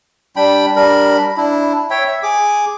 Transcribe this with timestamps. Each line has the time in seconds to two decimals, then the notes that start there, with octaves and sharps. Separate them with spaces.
0.36 G3 D4 G5 B5
0.76 G3 D4 A#4 B5
1.37 D4 E4
1.90 C#5 E5 G5
2.08 E5
2.23 G#4 D6